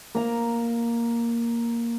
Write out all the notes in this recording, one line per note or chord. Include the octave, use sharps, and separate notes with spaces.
A#3 A#5